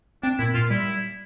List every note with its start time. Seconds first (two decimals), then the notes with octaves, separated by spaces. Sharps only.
0.23 C4 D4
0.39 A#2 E4
0.54 A#2 F4
0.70 G3 E4